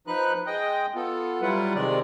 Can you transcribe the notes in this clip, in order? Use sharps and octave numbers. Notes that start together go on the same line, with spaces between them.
F3 D#4 B4 F#6
G#3 D#5 G5
B3 F4 A4
F#3 G3 E4 F4 B4 F#5
C3 D#3 G#3 D5